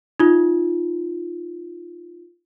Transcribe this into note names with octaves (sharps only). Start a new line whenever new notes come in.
D#4 F4